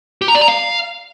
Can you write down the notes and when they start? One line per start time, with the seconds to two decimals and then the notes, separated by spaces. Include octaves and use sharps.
0.22 G4
0.28 A#5
0.35 D5
0.41 A#5
0.48 F5